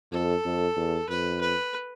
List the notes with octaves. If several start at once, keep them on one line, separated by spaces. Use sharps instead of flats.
F2 A4
F2
E2
F2 B4
B4